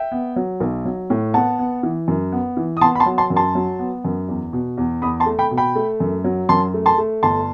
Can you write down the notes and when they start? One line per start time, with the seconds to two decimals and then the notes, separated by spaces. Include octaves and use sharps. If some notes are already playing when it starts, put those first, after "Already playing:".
Already playing: E5 G5
0.12 B3
0.36 F#3
0.60 B1
0.85 F#3
1.10 A2
1.34 B3 F#5 A5
1.59 B3
1.83 E3
2.08 F#2
2.32 B3
2.57 E3
2.77 D#6
2.81 B3 A5 C6
2.95 B5
3.00 A5 C6
3.06 F#3
3.18 A5 C6
3.30 F#2
3.36 A5 C6
3.55 F#3
3.79 B3
4.05 F#2
4.28 E2
4.53 B2
4.78 E2
5.02 E2 B5 D#6
5.20 A5 C6
5.26 A3
5.39 G5 B5
5.51 B2
5.57 G5 B5
5.76 A3
6.00 F#2
6.24 F#3
6.49 F#2 A5 C6
6.74 A3
6.86 A5 C6
6.98 A3
7.23 G1 A5 C6